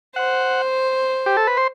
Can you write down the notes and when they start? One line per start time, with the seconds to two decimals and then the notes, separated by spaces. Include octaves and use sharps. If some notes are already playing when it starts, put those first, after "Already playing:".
0.16 C5 F#5
1.26 G4
1.37 A4
1.47 B4
1.57 C5